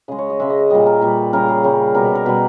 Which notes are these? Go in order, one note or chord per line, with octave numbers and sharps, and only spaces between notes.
C#3 G#3 D#5
C#5
D#5
C#3 G#3 E5
D#5
D#5
A#2 G3 D#5
A#4
A#2 G3 B4
C#3 G3 A#4
G#4
C#3 G3
B2 G3 A#4
B4
A#4
B2 G3 B4